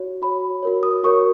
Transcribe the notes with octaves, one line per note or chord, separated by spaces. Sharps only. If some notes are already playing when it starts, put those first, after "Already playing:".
Already playing: F#4 C#5
F#4 C#5 B5
F#4 A#4 C#5
D#6
F#4 A#4 C#5 C#6